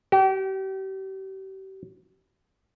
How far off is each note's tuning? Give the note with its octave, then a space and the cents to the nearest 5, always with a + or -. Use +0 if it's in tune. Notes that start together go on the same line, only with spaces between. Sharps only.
G4 -35